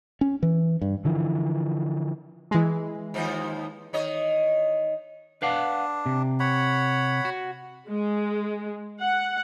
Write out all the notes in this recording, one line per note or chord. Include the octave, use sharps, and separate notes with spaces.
C#4
E3
G2
D3 E3 F3
E3 G#3
D#2 F3 C5
D#3 C#5 D#5
D4 B4 F5 F#5
C3
C#5 F#5 B5
F#4
G#3
F#5